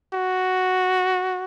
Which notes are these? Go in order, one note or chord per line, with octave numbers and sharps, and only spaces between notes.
F#4